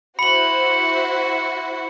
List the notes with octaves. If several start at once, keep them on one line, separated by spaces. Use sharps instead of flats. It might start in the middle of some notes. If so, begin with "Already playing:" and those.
E4 F#4 C5 B5 C#7 F#7